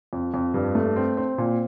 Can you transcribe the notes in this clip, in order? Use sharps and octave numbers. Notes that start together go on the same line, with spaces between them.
F2
F2
G2
A3
C4
C4
A#2